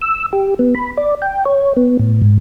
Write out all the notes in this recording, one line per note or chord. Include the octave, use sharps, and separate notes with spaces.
E6
G4
B3
B5
D5
G5
C#5
B3
A2
G#2